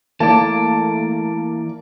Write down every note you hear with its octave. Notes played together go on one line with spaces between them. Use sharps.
E3 A3 A#3 D5 A5